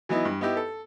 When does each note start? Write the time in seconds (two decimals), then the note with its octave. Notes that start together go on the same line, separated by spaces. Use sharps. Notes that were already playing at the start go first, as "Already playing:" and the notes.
0.09 E3 F#3 B3 D#4 E4
0.25 G2
0.41 B3 D#4 E4 G4
0.57 A4